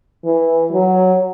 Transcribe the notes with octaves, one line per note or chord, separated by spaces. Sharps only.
E3
F#3